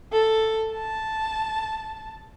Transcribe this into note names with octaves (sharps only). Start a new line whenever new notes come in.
A4
A5